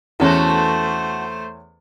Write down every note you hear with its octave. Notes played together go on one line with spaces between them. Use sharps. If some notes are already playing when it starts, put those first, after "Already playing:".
E2 A3 B3 C#4 F#4 A4 C5